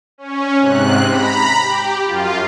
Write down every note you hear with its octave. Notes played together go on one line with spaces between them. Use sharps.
C#4
G#2 C3 F#6
A#5 B5
G4
F#2 F4